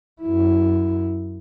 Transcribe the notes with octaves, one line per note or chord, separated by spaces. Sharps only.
F#2 E4